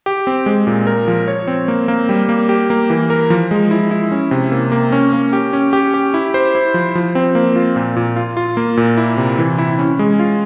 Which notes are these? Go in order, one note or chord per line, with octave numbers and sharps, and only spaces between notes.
G4
C4
G#3
A#2
A#4
F3
C#5
C4
A#3
A#3
G3
A#3
G4
A#3
E3
A#4
F3
G#3
E4
E4
C#4
C3
A#3
A#3
C#4
A#3
G4
C#4
G4
G4
E4
C5
E4
F3
F3
C4
A#3
F4
A#2
A#2
F4
F4
A#3
A#2
E4
C3
E3
E4
C#4
G#3
F4